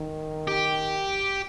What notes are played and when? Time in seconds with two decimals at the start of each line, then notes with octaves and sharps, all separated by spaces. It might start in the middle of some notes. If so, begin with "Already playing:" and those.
Already playing: D#3
0.48 G4